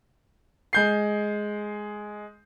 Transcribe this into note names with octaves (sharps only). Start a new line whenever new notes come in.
G#3 G6 C7